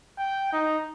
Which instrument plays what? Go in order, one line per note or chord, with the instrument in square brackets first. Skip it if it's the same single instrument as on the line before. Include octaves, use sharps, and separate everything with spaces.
[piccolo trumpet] G5
D#4